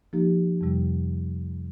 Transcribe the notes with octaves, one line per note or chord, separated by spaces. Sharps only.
F3 A#3 D#4 G4
F2 C3 G3